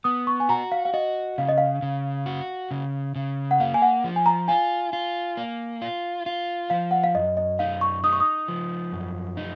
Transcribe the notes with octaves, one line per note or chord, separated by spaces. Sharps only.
B3 D#6
C#6
G#5
F#4 A#5
F5
F5
F#4 D#5
C#3 F5
D#5
F5
C#3
F#4
C#3
C#3
F#5
A#3 F5
G#5
F#5
F3
G#5
A#5
F4 G#5
F4
A#3
F4
F4
F3 F5
F#5
F5
F#2 D#5
D#5
D#4 F5
C#6
D#4 D#6
C#6
D#6
F3
F#2
D#4